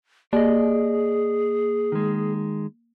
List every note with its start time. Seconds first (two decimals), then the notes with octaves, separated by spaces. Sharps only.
0.33 A#3 G#4 D5 D#5
1.92 D#3 G#3